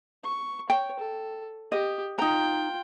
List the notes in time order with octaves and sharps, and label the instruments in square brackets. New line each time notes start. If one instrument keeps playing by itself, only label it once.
[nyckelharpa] C#6
[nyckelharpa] C#5 [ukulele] G5
[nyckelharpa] A4
[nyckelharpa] G4 [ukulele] D#5
[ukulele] D#4 A#5 [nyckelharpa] F4 G5